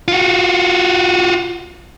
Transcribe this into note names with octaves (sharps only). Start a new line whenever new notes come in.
F4 F#4